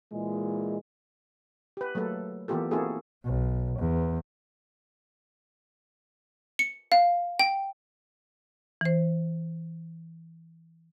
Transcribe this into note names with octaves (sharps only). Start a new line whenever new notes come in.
A#2 E3 G#3
G4 B4
F#3 A3 A#3 A4 B4
E3 A#3 B3 F4 G4 A4
A#3 C4 E4 F#4 G#4 A4
B1
E2
C#7
F5
G5
E3 C5